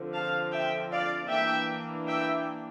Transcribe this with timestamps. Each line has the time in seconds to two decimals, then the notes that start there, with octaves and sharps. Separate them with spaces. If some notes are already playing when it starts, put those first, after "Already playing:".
Already playing: D3 F3 C4
0.14 F5 A5
0.52 E5 G5
0.91 D5 F5
1.30 E3 A#3 D4 E5 G5
2.08 E5 G5